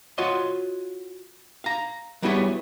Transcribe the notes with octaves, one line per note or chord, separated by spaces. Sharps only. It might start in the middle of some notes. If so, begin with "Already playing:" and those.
F4 F#4 C#5 D#5 C6
F5 A#5
F#3 G3 B3 E4 G#4 C#5